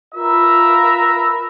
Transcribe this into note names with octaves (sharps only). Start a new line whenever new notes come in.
F4 A#4 B4 E5 A#5